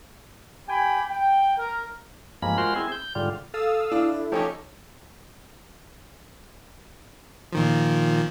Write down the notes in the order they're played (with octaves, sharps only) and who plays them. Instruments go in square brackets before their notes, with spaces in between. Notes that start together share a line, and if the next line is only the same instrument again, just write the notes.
[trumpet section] G4 G5 G#5 B5
G5
A#4
[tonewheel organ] G2 F3 G#3 A#3 B5
G#3 F4 F#4 A#4 C5 C6
C4 E4 G#4
G6
G#2 D3 G3 F4
[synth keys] A4 [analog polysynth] F5 D#6 E6
[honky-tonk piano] D4 [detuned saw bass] E4
[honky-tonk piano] F3 C#4 D#4 [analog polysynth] G4 A4 C#5
[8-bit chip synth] A#2 D#3 F3